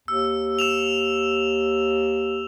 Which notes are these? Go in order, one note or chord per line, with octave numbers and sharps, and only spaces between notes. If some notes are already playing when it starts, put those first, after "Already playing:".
D#2 E6
E6 E7 F7